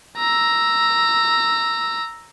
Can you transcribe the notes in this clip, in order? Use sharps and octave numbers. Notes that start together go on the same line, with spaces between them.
A#5 E6